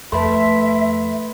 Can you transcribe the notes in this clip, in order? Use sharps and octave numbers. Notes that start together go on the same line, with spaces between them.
F2 A3 B4 E5 B5 C6